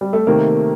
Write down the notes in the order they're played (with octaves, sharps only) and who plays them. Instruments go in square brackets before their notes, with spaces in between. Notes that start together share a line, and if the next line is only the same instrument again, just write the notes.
[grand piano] G3
A3
[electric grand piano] C3 D#3 A3 [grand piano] A#3